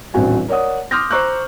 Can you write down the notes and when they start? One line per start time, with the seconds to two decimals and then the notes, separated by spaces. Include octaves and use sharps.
0.14 D#1 A1 C4 D4 F#4 G#5
0.48 A#4 C#5 D5 F#5 D#6
0.91 C6 D6 D#6 F6 G6 A#6
1.11 C5 A#5 C#6 D6 E6 F#6